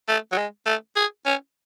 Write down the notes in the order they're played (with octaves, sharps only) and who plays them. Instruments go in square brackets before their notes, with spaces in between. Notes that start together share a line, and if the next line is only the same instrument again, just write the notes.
[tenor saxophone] A3
F#3
G#3
A3
G#4
C#4